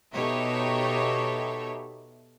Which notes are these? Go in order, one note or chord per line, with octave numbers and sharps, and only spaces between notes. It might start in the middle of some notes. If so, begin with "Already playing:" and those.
B2 D#4 G4 A4 C#5 E5